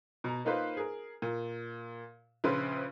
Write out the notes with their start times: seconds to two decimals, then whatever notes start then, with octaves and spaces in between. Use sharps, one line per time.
0.24 B2 A#5
0.45 A#3 D#4 F4 B4 C5
0.77 G#4 A#4
1.22 A#2
2.44 A#1 C#3 B4 C5 C6